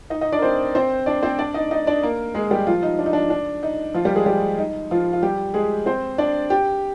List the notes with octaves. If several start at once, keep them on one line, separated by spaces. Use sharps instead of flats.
D#4 D#5
D#4 D#5
D4 D5
A#4
C4 C5
C4 C5
D4 D5
C4 C5
D4 D5
D#4 D#5
D#4 D#5
D4 D5
A#3 A#4
G#3 G#4
G3 G4
F3 F4
D#4
D4
D#4
D4
D4
D#4
F3 F4
G3 G4
G#3 G#4
G3 G4
D#4
F3 F4
F4
G3 G4
G#3 G#4
C4 C5
D4 D5
G4 G5